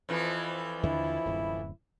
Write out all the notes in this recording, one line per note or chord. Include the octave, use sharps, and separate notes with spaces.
F2 E3 F3
D#2 D3 D4 E4
D1 F#2